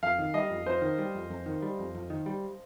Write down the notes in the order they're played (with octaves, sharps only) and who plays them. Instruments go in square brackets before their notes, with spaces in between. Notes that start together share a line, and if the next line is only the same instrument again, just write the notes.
[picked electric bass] F2 [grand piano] F5
[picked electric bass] D#3
[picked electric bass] G3 [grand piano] D#5
[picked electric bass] F2
[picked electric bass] F2 [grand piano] C5
[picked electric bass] D#3
G3
F2
F2
D#3
G3
F2
F2
D#3
G3